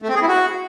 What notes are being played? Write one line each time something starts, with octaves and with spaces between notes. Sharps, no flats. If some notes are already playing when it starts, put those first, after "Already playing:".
A3
C4
G#4
E4
F#4